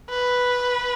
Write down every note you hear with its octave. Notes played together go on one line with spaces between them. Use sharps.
B4